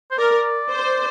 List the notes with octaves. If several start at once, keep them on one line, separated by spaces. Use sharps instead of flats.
C5
A#4 D5
C5